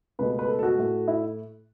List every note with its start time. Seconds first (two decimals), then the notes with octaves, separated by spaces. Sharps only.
0.19 C#2 B2 A3 B4
0.39 B4
0.48 A4
0.59 A4
0.63 F#4
0.79 A2 A3
1.08 E4